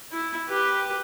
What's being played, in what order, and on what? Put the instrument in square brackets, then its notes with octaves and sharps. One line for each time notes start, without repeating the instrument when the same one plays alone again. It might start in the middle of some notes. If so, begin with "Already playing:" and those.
[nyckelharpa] E4
G4 B4